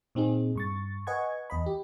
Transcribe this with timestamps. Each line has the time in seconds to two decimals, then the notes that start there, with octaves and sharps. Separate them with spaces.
0.15 A#2 C4 D#4 G#4
0.55 G2 C#6 A6
1.07 B4 D#5 F#5 G#5 C#6 G#6
1.50 E2 D#5 B5
1.66 G4